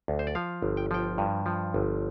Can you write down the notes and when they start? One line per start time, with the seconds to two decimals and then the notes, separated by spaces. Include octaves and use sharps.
0.08 D2
0.19 C5
0.27 D5
0.35 F3 F5
0.62 G1
0.77 G5
0.91 F3 G5
1.18 G2
1.46 F3
1.74 G1